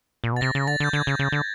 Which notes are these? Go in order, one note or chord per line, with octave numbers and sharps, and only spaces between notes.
A#2
B2
A6
C3 A#6
C#3
D3 A6
D3 G6
D3 G#6
C#3
C#3
D3